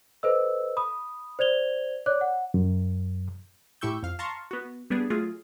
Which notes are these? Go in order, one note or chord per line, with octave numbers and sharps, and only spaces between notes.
A4 B4 C5 D#5 E6
B5 D#6
C5 D5 G#6 F7 G7
C#5 D5 D6 F#6
F#5
F#2
A2 E4 G4 C#6 E6 G6
F2 F5
F5 A5 A#5 C6 C#6
B3 F#4
G3 B3 D4 G#4
F#3 A3 F4 G#4